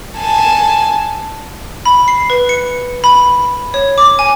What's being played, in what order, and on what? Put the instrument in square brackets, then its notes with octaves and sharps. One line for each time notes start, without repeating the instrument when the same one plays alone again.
[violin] G#5 A5
[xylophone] B5
C7
B4
C#7
B5
C#5
D6
G#5